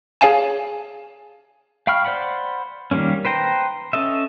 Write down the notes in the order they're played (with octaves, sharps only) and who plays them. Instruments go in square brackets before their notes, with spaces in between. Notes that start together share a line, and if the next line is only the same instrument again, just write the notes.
[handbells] G#4 C#5 F5 G#5 A5
[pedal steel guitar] F5 G5 B5 C#6 F6
C5 D5 F#5 B5
D#3 G3 G#3 A#3 C#4
B4 C5 G5 A#5
C#4 A4 D#5 E5